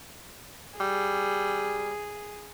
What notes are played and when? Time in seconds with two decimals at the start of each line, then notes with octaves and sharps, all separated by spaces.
0.80 G3 G#4